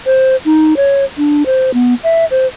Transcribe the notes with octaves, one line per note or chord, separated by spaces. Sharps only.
C5
D#4
C#5
D4
C5
B3
E5
C5